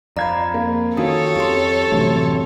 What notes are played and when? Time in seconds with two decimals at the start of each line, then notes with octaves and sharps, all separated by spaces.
0.17 F2 D5 F5 A#5 B5 G#6
0.54 A#3
0.97 D#3 C#4 F4 F#4 A4 C#5 F5 D#6
1.36 F2 G4 C6
1.91 F#1 F#2 A2 C3 E3 A3